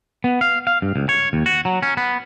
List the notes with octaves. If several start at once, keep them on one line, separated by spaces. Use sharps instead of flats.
B3
F5
F5
G2
C#2
C#5
D#2
F#4
F#3
C#4
B3